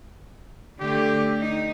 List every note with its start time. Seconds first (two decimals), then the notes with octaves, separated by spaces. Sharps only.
0.80 D3 A3 G4
1.40 D#4